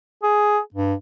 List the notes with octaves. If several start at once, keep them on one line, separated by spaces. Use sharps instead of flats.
G#4
G2